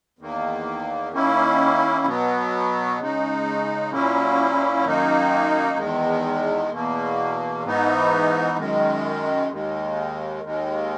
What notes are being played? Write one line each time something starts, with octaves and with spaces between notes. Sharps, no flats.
E2 D#3 A#3
D#3 A#3 C#4 E4
B2 F#3 B3
C#3 G#3 D#4
A#2 F#3 A#3 C#4 E4
F#2 D#3 A#3 D#4
E2 D#3 G#3
E2 B2 A#3
G#2 E3 B3 D#4
F#2 D#3 G#3
D#2 D#3 G#3
D#2 D#3 G#3